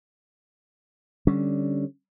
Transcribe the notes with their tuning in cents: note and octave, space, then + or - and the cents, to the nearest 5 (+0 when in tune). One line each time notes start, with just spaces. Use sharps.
D3 +0 G3 +0 C#4 +0